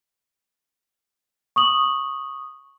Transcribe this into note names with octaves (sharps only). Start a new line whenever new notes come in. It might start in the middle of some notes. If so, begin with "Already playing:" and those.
C#6 D#6 F#7